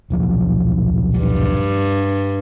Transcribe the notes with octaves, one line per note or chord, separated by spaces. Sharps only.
D#1 B1 F3
G2